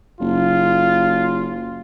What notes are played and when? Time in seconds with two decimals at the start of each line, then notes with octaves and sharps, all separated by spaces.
0.20 F#1 F4